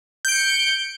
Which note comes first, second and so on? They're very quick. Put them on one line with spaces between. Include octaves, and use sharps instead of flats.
G6 D7 C#7